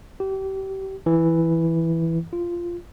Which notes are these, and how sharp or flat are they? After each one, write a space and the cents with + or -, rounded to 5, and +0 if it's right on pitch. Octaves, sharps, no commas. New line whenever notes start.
G4 -30
E3 +0
F4 -10